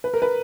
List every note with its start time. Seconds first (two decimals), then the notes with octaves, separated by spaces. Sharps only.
0.04 B4
0.14 A#4
0.22 B4